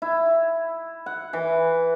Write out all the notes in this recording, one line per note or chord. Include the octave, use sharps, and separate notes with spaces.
E4
F#5
E3